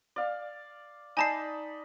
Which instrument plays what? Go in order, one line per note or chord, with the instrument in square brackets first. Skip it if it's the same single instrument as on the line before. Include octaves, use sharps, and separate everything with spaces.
[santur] D5 F5
[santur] D#4 D5 B5 [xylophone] G#5 A5 C7